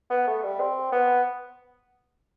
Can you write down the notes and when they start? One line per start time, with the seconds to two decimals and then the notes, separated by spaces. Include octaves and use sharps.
0.10 B3
0.27 A3
0.43 G3
0.60 C4
0.92 B3